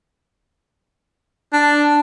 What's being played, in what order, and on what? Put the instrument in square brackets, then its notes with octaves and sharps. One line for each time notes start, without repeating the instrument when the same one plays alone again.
[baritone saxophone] D4